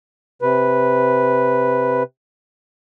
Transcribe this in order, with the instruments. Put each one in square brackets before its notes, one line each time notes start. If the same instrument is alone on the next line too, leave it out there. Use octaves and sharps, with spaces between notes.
[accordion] C3 B4